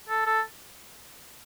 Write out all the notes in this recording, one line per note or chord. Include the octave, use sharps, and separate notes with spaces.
A4
A4